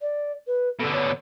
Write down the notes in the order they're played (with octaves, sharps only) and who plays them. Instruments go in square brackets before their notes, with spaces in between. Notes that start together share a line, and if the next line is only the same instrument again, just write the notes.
[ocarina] D5
B4
[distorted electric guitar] B2 D3 [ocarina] A4
[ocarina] C#5